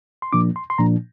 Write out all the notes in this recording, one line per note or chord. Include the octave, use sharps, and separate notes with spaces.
C6
A#2 F3 A#3 D4 D6
C6
C6
A#2 F3 A#3 D4 A#5